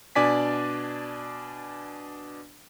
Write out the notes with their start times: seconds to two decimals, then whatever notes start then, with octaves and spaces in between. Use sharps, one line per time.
0.15 B2 D4 D5 G#5 B6